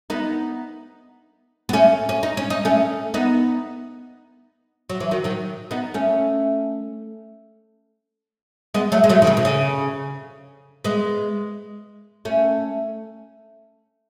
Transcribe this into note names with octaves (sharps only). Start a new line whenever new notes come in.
B3 D#4
B3
A3 C#4
C#4
D#4
C#4
D#4
A3 C#4
B3 D#4
F#3
E3
D#3 F#3
D#3 F#3
B3 D#4
A3 C#4
G#3 B3
F#3 A3
G#3
F#3 A3
D#3
C#3
B2
C#3
G#3 B3
A3 C#4